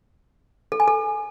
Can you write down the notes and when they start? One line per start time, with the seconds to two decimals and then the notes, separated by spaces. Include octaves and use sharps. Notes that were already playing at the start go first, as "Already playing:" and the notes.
0.72 A4
0.80 G#5
0.88 A4